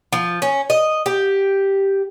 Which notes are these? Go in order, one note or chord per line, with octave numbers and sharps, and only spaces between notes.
F3
C#4
D#5
G4